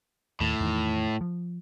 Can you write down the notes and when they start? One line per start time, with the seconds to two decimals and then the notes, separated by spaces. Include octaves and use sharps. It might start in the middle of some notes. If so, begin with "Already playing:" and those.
0.41 D#2 A2
0.61 E2 D#3
1.21 F3